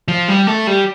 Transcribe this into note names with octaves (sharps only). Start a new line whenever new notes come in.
F3
G3
A3
G3